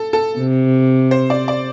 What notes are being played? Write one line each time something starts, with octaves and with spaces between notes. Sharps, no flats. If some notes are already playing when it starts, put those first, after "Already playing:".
Already playing: A4
A4
C3
C5
D5
D5